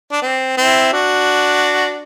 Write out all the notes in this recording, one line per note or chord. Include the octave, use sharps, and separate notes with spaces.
D4
C4
C4 E4
D4 F#4